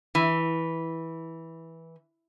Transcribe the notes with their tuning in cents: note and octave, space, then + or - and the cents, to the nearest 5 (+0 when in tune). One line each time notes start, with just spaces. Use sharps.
E3 -10